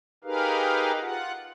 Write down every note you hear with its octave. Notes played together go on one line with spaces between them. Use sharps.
D#4 G4 G#4 A#4 B4 F5
F4 F#5